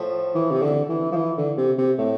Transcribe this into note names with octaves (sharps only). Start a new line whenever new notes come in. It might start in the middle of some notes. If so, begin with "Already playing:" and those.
Already playing: A2 F3
E3
C3
D3
E3
F3
E3
D3
C3
C3
A2